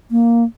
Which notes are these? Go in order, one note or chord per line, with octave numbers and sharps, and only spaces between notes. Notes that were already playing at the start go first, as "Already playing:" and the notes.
A#3